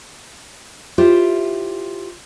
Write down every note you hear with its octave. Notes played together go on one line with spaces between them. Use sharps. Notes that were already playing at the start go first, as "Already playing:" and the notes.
E4 F4 G4 C5